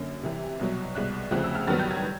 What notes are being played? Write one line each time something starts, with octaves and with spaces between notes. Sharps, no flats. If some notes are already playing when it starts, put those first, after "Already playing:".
Already playing: F#2 D3 A#3 C#4
C3 E3 G3
C2 B2 F#3
C2 B2 G#3 F#6
D2 C#3 F3 A3 C4 F#6
E6
F6
G2 D#3 F#3 B3 A6
G6
G#6